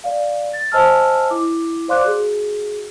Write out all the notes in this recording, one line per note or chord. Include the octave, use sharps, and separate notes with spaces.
D5 F5
A6
C5 D#5 G#5 A5 E6 F6
E4 D6
C5 D5 F5 C6 D6 F#6
F#4 G#4